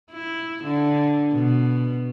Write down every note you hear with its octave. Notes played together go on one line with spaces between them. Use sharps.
E4
D3
B2